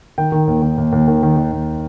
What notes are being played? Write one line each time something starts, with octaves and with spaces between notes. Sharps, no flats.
D#3 G5
D#3
D#2
D#3
D#2
D#2
D#3
D#3
D#3
D#2